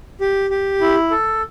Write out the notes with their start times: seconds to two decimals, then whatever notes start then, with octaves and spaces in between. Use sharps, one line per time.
0.21 G4
0.50 G4
0.81 E4
1.11 A4